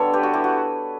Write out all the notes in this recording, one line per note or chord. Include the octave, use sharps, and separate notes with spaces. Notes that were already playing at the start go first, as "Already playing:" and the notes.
Already playing: D3 G3 B3 A4 C#5
G4 B4
F#4
E4 G4
F#4